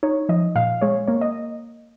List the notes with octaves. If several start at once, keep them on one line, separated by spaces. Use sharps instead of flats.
D#4 C#5
F3 D#5
A#2 F5
G#3 C#5
A#3 C#5
D#5